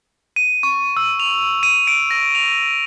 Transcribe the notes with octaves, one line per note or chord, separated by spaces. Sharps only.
D#7
C#6
E6
F7
D#7
D7
A#6
F7